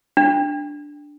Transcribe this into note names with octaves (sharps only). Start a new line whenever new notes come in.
D4